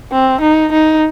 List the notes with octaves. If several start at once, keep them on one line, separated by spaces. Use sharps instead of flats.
C4
D#4
D#4